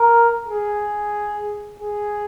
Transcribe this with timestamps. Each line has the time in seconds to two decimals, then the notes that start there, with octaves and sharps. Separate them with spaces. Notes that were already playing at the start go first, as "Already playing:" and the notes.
Already playing: A#4
0.47 G#4
1.80 G#4